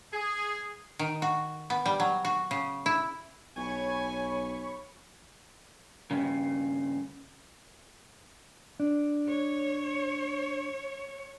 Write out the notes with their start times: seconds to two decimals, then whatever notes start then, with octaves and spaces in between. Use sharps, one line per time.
0.13 G#4
0.99 D#3
1.22 F#4
1.70 B3
1.86 G3
2.00 F#3
2.25 F#4
2.51 C#3
2.86 E4
3.57 B1 C#5 G#5 B5 C#6
6.11 G2 C#3
8.80 D4
9.28 C#5